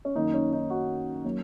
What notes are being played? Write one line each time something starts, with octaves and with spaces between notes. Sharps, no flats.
C#4
F#2 D#3 A#3 D#4
C#4
D#4
F#4
F#3 A#3 C#4